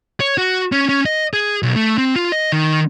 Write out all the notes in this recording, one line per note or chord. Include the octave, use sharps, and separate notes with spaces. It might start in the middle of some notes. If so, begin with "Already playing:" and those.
C#5
F#4
C#4
C#4
D#5
G#4
B1
A3
C4
F4
D#5
D#3